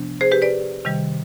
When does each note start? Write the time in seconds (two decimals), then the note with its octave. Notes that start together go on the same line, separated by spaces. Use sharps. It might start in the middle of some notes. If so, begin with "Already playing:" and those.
Already playing: C3 F3 B3 D4
0.21 G#4 C5
0.31 G4 B4
0.42 B4 D5
0.85 C3 D#3 G3